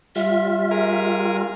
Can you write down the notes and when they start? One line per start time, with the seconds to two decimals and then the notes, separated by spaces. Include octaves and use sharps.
0.16 G3 F4 E5
0.71 G#4 A#4